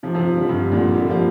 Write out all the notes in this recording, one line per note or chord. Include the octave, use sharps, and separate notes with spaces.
C3 F3
C3 F3
D3 G3
G2 C3
A#2 D3
D3 G3
F3 A#3